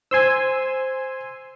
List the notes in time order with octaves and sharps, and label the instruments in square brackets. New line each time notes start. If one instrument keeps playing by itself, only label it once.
[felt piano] C5 [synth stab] G#5 C6 E6